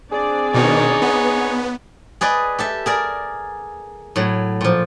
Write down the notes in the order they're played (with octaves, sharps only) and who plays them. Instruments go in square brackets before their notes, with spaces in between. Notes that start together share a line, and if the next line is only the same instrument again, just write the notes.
[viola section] C4 D4 D5 [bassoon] G#4
[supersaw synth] B2 D#3 [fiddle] D#4 C#5
[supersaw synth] B3
[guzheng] G#4 B4 D5 D#5
G4 A4 E5
G#4 A#4 D5
A2 F#3
A#2 F3